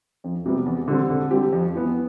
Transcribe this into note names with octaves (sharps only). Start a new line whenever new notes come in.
F2
C3 G3 B3
E2
D3 G3 C4
D3
G3 C4 G4
F2
E3 B3